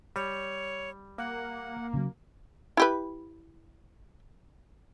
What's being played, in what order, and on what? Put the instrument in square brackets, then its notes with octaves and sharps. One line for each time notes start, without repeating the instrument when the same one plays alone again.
[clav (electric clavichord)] G3 [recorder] C#5
[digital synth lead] A#3 [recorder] F#5
[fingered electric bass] C#3 E3 F#3
[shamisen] E4 G4 B4